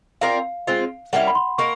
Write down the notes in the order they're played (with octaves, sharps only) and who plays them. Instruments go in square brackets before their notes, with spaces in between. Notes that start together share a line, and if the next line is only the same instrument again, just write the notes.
[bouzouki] C4 F4 A#4 D5 [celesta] F5
[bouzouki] G#3 C4 F4
[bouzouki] G3 A#3 C#4 E4 [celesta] F#5
[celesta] B5
C6
[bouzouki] A#3 D#4 A#4 [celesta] C#6